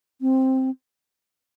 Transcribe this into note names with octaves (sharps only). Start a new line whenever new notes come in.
C4